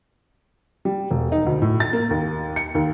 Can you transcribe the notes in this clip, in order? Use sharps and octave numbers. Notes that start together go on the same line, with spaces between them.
G3
E1
D#4
D2
A2
A6
A#3
D#2
C#7
D#2